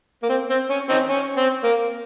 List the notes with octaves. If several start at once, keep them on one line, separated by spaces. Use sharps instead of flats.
A#3
C4
C4
C#4
C4 D#4
C#4
C4
A#3